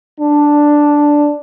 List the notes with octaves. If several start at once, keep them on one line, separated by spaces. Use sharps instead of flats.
D4